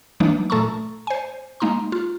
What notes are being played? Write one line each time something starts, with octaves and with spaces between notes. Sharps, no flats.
E3 F#3 G#3 A#3 D4 D#4
A#2 A3 A4 A5 A#5 C#6
C5 G#5
G#3 A#3 D#4 A#5 C6
F4